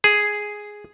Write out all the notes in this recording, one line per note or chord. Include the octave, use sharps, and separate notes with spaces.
G#4